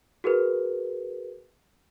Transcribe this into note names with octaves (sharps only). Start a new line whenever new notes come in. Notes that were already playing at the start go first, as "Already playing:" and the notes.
F#4 G#4 A#4 B4